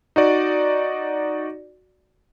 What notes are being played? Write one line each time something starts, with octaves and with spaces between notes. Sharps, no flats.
D#4 F#4 D5